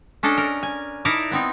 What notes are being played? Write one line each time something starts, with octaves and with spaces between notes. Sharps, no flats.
C#4 D4 A4 D#5
A#4
G#5
D#4 E4 A#4 D5 A5 A#5
B3 C4 D#4